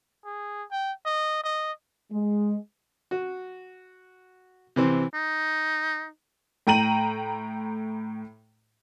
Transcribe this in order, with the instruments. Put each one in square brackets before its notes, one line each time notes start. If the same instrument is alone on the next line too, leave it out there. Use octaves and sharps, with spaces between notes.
[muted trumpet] G#4
G5
D#5
D#5
[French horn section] G#3
[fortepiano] F#4
C3 E3 C4
[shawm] D#4
[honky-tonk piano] A2 G5 A#5 D#7 F#7